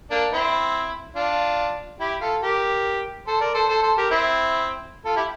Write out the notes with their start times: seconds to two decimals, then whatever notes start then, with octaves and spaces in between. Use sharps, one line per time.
0.11 A#3 D4
0.32 C4 E4
1.16 D4 F4
2.00 E4 G4
2.21 F4 A4
2.42 G4 A#4
3.27 A4 C5
3.41 A#4 D5
3.54 A4 C5
3.69 A4 C5
3.82 A4 C5
3.97 G4 A#4
4.11 C4 E4
5.05 F4 A4
5.16 E4 G4